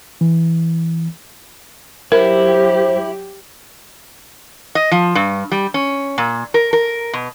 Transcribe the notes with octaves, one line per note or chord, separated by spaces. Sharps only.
E3
F#3 E4 G4 A#4 C5
D#5
F3
G2
G3
C#4
A#2
A#4
A#4
B2